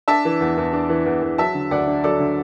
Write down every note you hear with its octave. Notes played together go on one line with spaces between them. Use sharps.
D4 E5 A5
E3
E2
E2
D4
E3
E2
E2
F#3 E5 A5
D3
D2 D5 F#5
D4
F#3 A4 D5
D3